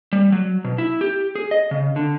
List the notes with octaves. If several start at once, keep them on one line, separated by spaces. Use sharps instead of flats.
G3
F#3
B2
E4
G4
G#4
D#5
C#3
D3